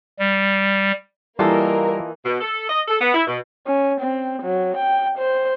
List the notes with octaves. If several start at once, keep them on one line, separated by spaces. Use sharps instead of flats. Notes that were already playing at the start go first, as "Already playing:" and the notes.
G3
E3 G3 A#3 F4 A4 A#4 D#5
B2
A4
D#5
A4
B3
E4
B2
C#4
C4
F#3
G5
C5